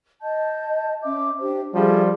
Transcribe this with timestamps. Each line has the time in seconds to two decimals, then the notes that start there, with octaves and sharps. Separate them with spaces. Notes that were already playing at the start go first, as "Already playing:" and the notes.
0.21 D#5 A5 G6
1.02 C#4 E5 D6
1.39 D4 G4 C5
1.74 F3 G3 G#4 A4 E5